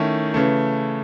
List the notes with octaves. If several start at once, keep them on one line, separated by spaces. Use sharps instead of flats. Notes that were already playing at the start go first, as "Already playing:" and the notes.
Already playing: D#3 A3 C#4 E4
C#3 E3 A3